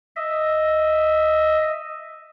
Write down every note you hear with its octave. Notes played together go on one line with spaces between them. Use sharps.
D#5 E5